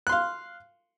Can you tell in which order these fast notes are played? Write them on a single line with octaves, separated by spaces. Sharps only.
F#6 C6 F5